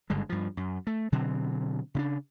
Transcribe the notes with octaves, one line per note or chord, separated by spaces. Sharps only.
F#1 G2 D3 G#3
G2 F3
F#2
A3
B2 D3 F#3 C4
C#3 C4 D4